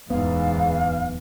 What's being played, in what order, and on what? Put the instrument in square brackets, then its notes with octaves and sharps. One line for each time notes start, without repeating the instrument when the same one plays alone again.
[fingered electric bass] D1 B3 [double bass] E2 E3 [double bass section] G#2 [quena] F5